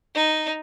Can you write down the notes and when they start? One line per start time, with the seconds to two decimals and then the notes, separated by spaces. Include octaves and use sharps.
0.15 D#4